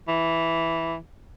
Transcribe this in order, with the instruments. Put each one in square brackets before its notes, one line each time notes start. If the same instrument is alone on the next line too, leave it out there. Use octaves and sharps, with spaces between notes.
[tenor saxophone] E3